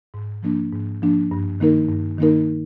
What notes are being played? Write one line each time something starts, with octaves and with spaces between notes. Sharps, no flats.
G#2
F3 A#3 D4
G#2
F3 A#3 D4
G2
D#3 A#3 D#4 A#4
G2
D#3 A#3 D#4 A#4